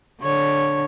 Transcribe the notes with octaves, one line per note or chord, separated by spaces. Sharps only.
D3 C#5